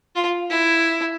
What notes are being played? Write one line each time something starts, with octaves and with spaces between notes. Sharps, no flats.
F4
E4